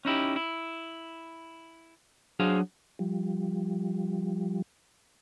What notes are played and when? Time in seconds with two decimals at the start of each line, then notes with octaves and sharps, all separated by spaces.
0.05 C#4 D#4 E4 G4
0.36 E4
2.40 F#3 D4 F#4 G#4 C5 F5
2.99 F3 G3